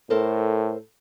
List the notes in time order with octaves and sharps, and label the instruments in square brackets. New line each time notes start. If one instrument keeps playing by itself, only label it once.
[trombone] A2 [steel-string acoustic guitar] A4 A#4 C5